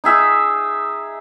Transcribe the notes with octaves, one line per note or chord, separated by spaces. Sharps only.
D#4 G#4 E5